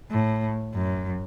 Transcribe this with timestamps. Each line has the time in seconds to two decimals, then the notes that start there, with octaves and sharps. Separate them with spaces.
0.11 A2
0.75 F#2